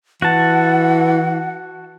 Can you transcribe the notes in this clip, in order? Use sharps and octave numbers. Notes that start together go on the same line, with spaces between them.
E3 F#4 F#5 A5